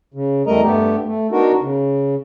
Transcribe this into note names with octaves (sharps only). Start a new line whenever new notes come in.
C#3
E2 G3 A3 A#4 D#5 A#5
G2 A3 B3 G4
A3
B3 D4 D#4 F#4 A#4
C#3